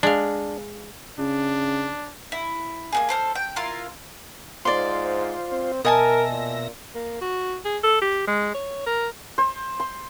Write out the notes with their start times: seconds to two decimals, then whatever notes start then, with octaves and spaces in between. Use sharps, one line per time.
0.03 G#3 D4 F5
1.19 C#3 D4
2.32 E4
2.92 A#3 B3 G#4
3.09 A4 C5 F6
3.35 G5
3.56 E4 F4 A#4 C6
4.65 G#2 F4 C5 D5 C6
5.52 C4
5.85 B2 A#4 D#5 E5 G#5 A5 A#6
6.29 A#2
6.95 A#3
7.21 F#4
7.65 G#4
7.84 A4
8.02 G4
8.27 G#3
8.55 C#5
8.87 A#4
9.38 C5
9.80 C6